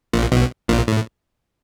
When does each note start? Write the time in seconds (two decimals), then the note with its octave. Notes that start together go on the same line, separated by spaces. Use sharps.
0.13 A#1 A#2
0.32 B1 B2
0.68 A#1 A#2
0.87 A2